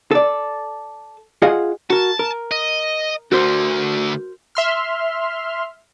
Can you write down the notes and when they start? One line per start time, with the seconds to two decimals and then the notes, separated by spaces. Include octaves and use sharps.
0.11 A4 D5
1.42 F4 G#4 D#5 F5 F#5
1.90 F#4 A#4 A5
2.19 A#4
2.51 D#5
3.32 D2 D3 F#4 A#4 C5
4.55 E5 C6 F6